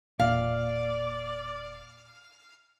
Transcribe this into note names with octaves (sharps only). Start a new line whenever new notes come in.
E1 A#2 D5 F5